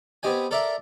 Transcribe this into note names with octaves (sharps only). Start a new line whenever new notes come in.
B3 C4 G4 D#5 G#5
A4 A#4 D5 E5 A#5